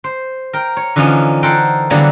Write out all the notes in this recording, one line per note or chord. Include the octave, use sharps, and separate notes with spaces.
C5
A#4 G5
C#5
D3 E3 F3 C#4 D#4
A4 A#4 C5 F#5 G5
D3 E3 F#3 G3 A#3 B3